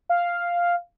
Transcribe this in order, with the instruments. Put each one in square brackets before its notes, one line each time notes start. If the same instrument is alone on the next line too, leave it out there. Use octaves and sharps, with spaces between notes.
[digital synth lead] F5